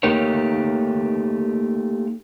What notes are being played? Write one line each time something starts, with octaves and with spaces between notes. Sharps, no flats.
A3 A#3 D#4 G4 A#4 C#5